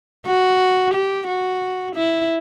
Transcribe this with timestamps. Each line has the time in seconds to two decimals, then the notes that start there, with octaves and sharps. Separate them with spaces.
0.27 F#4
0.94 G4
1.28 F#4
1.96 E4